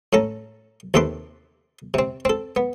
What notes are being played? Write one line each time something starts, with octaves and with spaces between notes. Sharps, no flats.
A2 C#4 A4 A#5
D#2 C3 A4 B4 C6 D6
C3 C4
C4 A4
B3